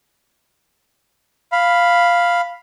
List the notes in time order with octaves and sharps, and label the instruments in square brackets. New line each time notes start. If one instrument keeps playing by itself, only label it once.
[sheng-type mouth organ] F5 B5